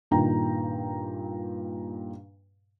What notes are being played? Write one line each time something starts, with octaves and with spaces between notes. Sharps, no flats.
G2 A#2 D#3 G5 A#5